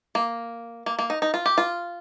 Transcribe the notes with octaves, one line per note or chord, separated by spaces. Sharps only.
A#3
A#3
A#3
D#4
D#4
F4
G4
F4